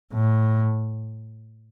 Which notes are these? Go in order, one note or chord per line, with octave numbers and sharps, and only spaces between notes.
A2